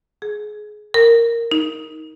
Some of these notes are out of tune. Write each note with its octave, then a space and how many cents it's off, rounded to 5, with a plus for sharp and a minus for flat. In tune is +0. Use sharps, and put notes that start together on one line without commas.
G#4 +20
A#4 -5
D#4 +20